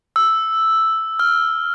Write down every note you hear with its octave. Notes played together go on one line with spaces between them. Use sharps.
E6
F6